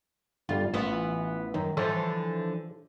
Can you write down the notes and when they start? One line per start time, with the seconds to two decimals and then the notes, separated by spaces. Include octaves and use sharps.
0.49 G1 D3 G3 F4
0.74 A1 E3 B3 F4
1.54 F#2 D#3
1.77 D3 E3 F3 A4 C5 C#5